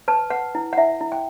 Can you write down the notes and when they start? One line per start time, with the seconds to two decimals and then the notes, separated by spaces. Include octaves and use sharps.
0.08 B4 A5
0.30 B4 F#5
0.55 E4
0.73 F#5
0.77 E4 E5
1.01 E4
1.12 G5